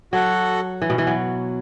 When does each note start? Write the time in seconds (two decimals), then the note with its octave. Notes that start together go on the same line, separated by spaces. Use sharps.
0.12 F#3 F#4 A4 F#5
0.82 E3
0.90 B2
0.98 E3
1.07 F#3